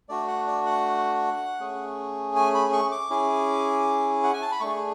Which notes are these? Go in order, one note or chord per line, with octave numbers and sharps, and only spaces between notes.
A3 D4 F#4 D5
F#5
D5
F#5
A3 C#4 G#4
G#5
B5
C#6
D6
C#4 E4 G#4
F#5
G#5
A5
B5
A3 D4 G#4 C#6